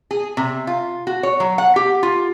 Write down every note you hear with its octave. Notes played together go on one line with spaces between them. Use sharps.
G#4
C3
F4
F#4
C#5
F#3
F#5
G4
F4